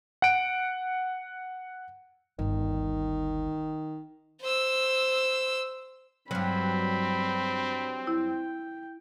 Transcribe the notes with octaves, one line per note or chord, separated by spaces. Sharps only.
F#5 D7
G1 D2 D#3
C5 E6
G2 F#3 C4 B5
E4 G5